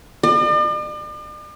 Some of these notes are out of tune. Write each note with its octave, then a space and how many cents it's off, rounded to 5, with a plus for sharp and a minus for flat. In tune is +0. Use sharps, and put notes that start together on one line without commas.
D5 +45